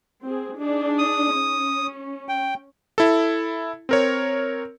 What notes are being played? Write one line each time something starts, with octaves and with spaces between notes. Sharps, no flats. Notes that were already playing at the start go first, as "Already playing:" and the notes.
C4 G#4
D4 D#4 G#4
D#6
C#4
G5
E4 A4
C4 A#4 C#5